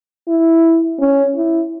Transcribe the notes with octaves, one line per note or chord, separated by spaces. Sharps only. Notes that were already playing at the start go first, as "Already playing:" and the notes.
E4
C#4
E4